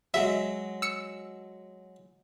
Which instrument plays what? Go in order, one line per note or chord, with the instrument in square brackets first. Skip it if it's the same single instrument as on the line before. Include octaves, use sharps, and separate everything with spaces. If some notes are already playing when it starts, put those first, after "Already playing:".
[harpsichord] F#3 G#3 [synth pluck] E5
[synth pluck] E6 C#7